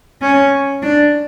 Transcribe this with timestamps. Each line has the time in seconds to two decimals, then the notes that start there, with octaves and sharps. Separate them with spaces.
0.22 C#4
0.82 D4